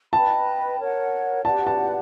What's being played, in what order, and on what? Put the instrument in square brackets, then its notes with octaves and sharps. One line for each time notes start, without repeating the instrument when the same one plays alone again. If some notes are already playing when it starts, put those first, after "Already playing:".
[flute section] B4 D#5 G5 B5 [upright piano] A5
[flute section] A#4 C#5 F#5
[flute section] G4 B4 D5 F#5 [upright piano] A5
[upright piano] A5